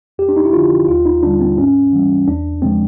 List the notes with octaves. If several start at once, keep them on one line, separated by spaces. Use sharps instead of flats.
F2 G4
D4
D#4
E4
D3 F3 F4
D#2 F4
D#4
D3 G3 D4
C4
G#2 C#4
E3 G3
E2 D4
C#3 F3 G#3 C4